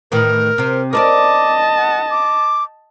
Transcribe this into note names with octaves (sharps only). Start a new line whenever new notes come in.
A2 D#3 E3 A#4
C3 C4
A#4 B4 D5 D#5 A5 D6
F#5
D6